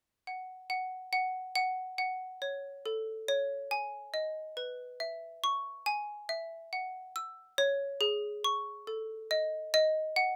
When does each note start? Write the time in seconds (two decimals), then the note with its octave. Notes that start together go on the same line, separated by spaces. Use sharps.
0.27 F#5
0.70 F#5
1.13 F#5
1.55 F#5
1.98 F#5
2.42 C#5
2.86 A4
3.28 C#5
3.71 G#5
4.14 D#5
4.57 B4
5.00 E5
5.44 C#6
5.86 G#5
6.29 E5
6.73 F#5
7.16 E6
7.58 C#5
8.01 G#4
8.44 C#6
8.87 A4
9.31 D#5
9.74 D#5
10.16 F#5